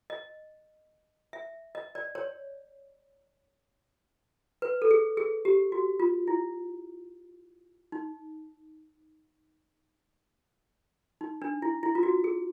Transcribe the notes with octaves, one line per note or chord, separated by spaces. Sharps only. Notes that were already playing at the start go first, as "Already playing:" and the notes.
D#5
E5
D#5
D5
C#5
B4
A4
G#4
G#4
G4
F#4
F4
E4
D#4
D#4
D4
E4
E4
F4
F#4
G#4